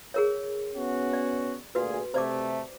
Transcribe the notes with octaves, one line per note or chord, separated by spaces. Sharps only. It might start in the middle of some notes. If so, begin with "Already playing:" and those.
G#4 A#4 C#5
B3 C#4 F#4
D5
D2 A#2 F#4 G#4 B4
C3 A3 C5 D5 D6